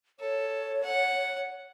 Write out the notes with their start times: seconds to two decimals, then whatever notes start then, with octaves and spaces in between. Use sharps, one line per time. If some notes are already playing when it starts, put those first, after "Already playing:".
0.20 A4 C#5
0.83 F#5